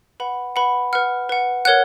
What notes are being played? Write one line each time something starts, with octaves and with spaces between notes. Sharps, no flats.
B4 F#5 B5
B4 F#5 B5
B4 F#5 F6
B4 F#5
A#4 C#5 F#5 F#6